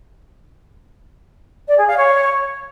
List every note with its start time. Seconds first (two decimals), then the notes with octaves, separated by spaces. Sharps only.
1.67 D5
1.77 G#4
1.87 F5
1.97 C#5